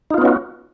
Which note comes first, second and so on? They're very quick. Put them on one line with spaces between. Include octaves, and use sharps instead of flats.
D#4 F4 B3 C#4 F#4